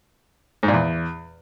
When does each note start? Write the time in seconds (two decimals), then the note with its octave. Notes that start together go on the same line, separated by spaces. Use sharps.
0.63 G#2
0.68 A#2
0.73 E2